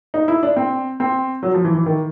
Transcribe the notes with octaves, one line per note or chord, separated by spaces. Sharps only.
D#4
E4
D4
C4
C4
F#3
F3
E3
E3
D#3